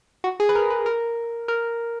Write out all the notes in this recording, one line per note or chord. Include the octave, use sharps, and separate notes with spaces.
F#4
G#4
B4
A#4
B4
A#4
A#4